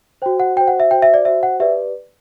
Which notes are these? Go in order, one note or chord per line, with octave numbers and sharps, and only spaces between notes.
F#4 C5 G5
F#5
F#4 C5 G5
F#5
E5
F#4 C5 G5
E5
D5
F#4 C5 E5
F#5
G4 B4 D5 E5